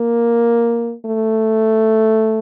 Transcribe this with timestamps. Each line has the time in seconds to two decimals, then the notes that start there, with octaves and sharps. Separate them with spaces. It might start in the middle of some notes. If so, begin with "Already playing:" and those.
Already playing: A#3
1.05 A3